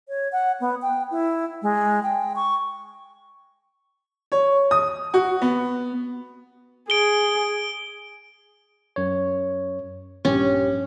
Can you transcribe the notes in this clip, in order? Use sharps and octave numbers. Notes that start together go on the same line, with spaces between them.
C#5
F#5
B3
G5
E4
G#3
G5
C#6
C#5
D#6
F#4
B3
G#4 D7 G7
F#2 C#5
A#1 G2 C#4 G4